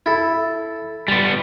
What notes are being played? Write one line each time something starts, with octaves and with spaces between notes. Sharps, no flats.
E4 A4
G3 B3 A5 C6